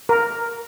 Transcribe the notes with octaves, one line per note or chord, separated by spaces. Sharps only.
A#4